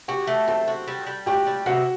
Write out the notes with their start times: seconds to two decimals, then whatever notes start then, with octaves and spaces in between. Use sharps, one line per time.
0.08 F#4 G4 G5
0.27 A3
0.48 C4 A4 A5
0.68 F#4
0.88 G3
1.06 G3
1.26 F#4 G4 G5
1.47 G3
1.66 C3 F#4 F#5